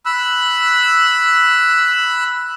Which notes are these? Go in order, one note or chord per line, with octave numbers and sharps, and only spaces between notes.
B5 E6 F#6